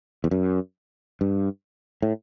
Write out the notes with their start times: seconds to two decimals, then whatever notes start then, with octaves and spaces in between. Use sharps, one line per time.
0.24 E2
0.31 F#2
1.21 G2
2.02 A2